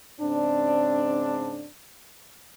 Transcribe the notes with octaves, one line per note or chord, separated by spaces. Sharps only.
G#2 C#3 C4 D4